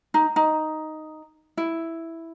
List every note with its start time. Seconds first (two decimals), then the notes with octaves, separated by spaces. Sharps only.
0.14 D#4
0.36 D#4
1.57 E4